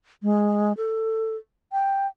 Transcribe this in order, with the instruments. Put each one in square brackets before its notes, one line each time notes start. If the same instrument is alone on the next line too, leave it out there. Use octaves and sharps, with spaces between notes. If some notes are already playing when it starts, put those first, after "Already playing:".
[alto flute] G#3
A4
G5